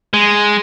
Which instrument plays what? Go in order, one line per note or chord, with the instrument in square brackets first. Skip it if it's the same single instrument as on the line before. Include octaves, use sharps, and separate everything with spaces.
[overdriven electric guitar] G#3